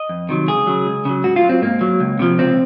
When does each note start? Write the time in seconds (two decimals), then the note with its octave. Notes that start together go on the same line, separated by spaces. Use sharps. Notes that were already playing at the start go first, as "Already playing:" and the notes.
Already playing: D#5
0.09 F2
0.29 C3 D#3 F#3
0.48 C#2 G#4
0.67 C#3 F#3
0.87 C#2
1.05 C#3 F#3
1.23 G#2 F#4
1.36 F4
1.43 F#3
1.49 C4
1.62 G#2 A#3
1.81 F#3
2.00 C#2
2.19 C3 F3
2.39 C#2 C4